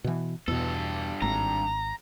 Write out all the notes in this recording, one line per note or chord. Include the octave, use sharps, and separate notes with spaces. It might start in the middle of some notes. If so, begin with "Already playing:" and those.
B2 E3
E2 G2 B2 A4
G#1 A#5